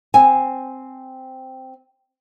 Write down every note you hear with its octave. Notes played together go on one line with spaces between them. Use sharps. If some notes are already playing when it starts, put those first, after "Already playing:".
C4 G#5